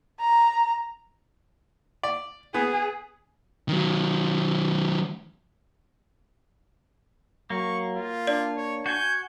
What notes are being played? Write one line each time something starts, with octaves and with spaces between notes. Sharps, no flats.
A#5
D5
B3 G#4
D#3 F#3
F#3 A#3 C#6
F4
D4 D5
C#5
F#4 G#5 G6